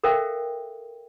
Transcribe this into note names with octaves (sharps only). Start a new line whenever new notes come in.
A4 A#4 C5 E5 F5 G5